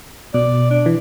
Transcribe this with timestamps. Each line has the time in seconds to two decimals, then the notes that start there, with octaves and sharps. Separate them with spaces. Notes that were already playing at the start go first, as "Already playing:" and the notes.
0.34 B2 D5
0.70 D4
0.86 E3